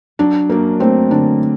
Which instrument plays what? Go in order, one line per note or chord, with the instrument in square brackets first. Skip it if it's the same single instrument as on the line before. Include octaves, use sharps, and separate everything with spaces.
[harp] F#3 [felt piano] D4
[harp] F#2 [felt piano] A#3
[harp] A3 [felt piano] C4
[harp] D3 [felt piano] D4